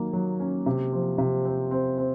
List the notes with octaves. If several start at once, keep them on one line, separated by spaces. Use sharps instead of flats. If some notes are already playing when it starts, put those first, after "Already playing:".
Already playing: D#3 F#3 A#3
F#3
C#4
C3
F3
C3
C4
C4
C4